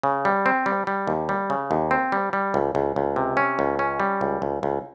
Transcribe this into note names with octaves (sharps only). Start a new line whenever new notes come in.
C#3
G3
C4
G3
G3
D#2
G3
C#3
D#2
C4
G3
G3
C#2
C#2
C#2
C3
C#4
C#2
C#4
G3
C#2
C#2
C#2